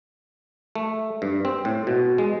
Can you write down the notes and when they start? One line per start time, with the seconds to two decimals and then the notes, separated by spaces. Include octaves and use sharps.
0.75 A3
1.22 G2
1.45 C4
1.65 A2
1.87 B2
2.18 G#3